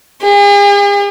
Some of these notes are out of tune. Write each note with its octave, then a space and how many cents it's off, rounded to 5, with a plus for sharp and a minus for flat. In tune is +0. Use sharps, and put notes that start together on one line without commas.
G#4 -45